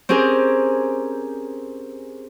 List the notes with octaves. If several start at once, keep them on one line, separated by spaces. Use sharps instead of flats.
C4 C#4 G4 G#4 A#4